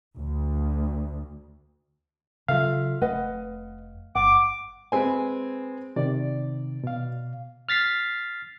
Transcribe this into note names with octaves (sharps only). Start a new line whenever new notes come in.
D2
C#3 F#3 F4 A4 E5 F5
F1 A3 B4 D#5 F#5
G1 F#5 D6
G#3 C4 B4 C5 G#5
C3 D#3 D5
B2 F5
F6 A6 B6 C7